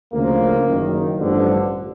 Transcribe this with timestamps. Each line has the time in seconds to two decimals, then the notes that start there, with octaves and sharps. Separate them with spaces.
0.13 D2 C#3 F3 A#3
0.66 F#1 F#2 D#3
1.17 A1 G2 D3 F3